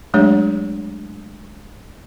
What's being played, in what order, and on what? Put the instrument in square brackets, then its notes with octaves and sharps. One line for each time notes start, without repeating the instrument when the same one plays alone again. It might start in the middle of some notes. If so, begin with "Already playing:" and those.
[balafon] F#3 G#3 A3 D4 G4 C#5